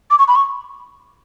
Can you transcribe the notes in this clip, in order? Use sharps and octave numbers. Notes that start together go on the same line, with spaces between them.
D6
C#6
B5
C#6